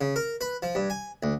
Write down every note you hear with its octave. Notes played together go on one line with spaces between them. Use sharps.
C#3
A#4
B4
F3
G2
G#5
D2